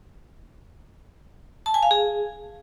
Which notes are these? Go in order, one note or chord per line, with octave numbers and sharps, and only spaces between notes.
A5
G#5
F5
G#4